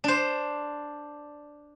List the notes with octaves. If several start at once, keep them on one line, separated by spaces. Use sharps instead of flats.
D4 C5